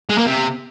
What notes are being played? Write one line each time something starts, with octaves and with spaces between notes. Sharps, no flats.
G#3
A#3
C3